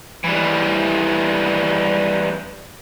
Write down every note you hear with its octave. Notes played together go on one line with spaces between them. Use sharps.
E3 G3